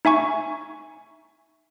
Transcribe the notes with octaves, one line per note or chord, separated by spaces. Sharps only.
D#4 E5 G#5 C#6